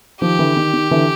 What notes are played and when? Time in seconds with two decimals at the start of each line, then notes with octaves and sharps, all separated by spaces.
0.21 D#3 F3 G4
0.39 D3 E3
0.57 D#3
0.74 D#3
0.91 D3 E3